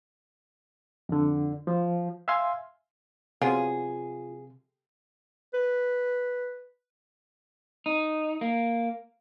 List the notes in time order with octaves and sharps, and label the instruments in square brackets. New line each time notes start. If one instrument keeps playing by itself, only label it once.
[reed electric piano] F2 D3
F3
E5 F5 G#5 C6
[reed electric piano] C3 [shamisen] F3 F#3 B3 [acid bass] F4 [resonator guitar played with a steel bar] G#4
[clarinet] B4
[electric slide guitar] D#4
A#3